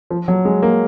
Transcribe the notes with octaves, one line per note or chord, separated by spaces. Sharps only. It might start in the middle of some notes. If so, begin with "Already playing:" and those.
F3
F#3
G#3
A#3